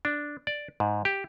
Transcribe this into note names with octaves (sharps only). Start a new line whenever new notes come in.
D4
D5
G#2
G4